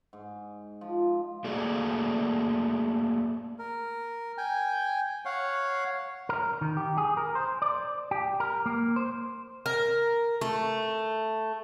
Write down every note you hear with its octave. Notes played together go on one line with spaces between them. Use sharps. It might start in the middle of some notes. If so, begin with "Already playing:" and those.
G#2
F3
A3 A#3 F#4 G#4 D5 F5
A#4
G5 G#5
C#5 F5 F#5
A#4
D#3
G4
G#4
A#4
C5
D5
G4
A#4
A#3
C5
A#4
A3